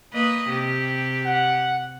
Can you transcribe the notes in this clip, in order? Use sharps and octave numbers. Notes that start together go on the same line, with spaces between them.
A#3 B4 D#5
C3 G4
F#5